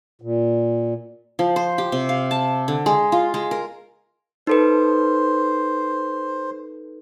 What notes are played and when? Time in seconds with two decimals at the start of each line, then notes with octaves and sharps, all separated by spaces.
0.22 A#2
1.39 F3
1.56 C5
1.78 G4
1.92 C3
2.09 F5
2.31 A5
2.68 D3
2.86 G#3
3.12 F4
3.34 G#3
3.51 A#4
4.47 D#4 A4 B4 C5